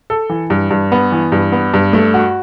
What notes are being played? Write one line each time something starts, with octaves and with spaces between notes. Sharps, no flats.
A4
E3
G2
G2
B3
E3
G2
B3
G2
A3
F#4